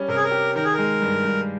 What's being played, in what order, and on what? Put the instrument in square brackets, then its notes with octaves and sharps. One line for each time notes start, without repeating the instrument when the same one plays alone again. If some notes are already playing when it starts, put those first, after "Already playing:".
Already playing: [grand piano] G3 C#4
[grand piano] C3 [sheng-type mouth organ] A#4
[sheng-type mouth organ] G#4
A#4
[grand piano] G4
[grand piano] D#3 [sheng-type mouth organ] A#4
[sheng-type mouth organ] G#4
[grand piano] G#3 [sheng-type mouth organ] A#4
[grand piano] G2
G2